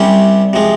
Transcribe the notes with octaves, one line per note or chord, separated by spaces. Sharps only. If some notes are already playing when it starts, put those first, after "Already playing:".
Already playing: C2 C3 G3 C#4 G4
C3 F3 G#3